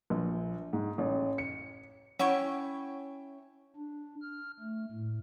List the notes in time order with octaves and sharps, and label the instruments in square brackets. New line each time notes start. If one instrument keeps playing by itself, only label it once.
[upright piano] A#1
G#2
A1
C#7
[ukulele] C#4 [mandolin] E4 G5 C#6 [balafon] C#5 F#5
[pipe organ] D4
F6
A3
A2